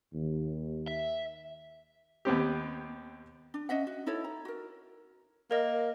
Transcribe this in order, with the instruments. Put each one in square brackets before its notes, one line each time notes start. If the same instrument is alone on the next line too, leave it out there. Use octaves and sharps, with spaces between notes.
[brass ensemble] D#2
[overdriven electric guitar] E5
[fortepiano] D#2 B3 C4 G4
[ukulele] D4
C#4 D#5 E5 F#5
F#4
D#4 E4 A4 C#5
A#5
F#4 A#4
[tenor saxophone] A#3 [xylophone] A#4 D#5